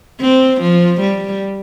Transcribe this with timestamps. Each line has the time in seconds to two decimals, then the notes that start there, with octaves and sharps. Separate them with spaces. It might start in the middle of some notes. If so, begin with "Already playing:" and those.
0.21 C4
0.61 F3
1.00 G3